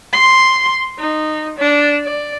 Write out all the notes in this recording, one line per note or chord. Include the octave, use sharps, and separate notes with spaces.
C6
D#4
D4
D5